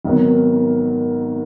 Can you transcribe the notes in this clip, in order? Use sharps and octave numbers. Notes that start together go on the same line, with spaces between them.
G#1 G#2 D#3 F#3 B3